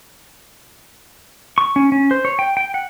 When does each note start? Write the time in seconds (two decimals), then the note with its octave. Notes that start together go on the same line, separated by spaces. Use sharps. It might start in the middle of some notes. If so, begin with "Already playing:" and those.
1.58 C#6
1.76 C#4
1.92 C#4
2.11 C5
2.25 C#5
2.39 G5
2.57 G5
2.74 F#5